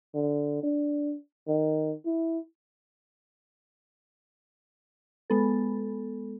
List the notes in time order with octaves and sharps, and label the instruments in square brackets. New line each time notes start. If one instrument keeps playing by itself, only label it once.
[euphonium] D3
D4
D#3
E4
[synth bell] G#3 B3 A4